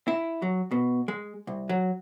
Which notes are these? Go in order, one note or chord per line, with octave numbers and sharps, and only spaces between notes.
E4
F#3
B2
G#3
C2
F#3